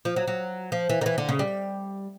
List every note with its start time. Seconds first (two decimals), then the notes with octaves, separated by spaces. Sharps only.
0.05 F3
0.16 F#3
0.28 F#3
0.72 F3
0.90 E3
1.01 D#3
1.06 E3
1.18 D3
1.29 C#3
1.39 G3